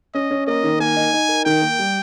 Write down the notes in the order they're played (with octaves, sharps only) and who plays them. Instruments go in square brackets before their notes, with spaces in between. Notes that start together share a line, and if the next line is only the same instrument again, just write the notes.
[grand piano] C#4 [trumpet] D#5
[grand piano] C#4
[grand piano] A#3 [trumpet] D#5
[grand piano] D#3
[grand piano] A#3 [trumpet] G#5
[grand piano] D#4
D#4
A#4
[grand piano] D#3 [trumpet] G5
[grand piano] A#3
G3